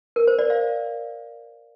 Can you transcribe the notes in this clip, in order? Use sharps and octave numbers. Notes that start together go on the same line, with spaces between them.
A#4
C5
D5
F5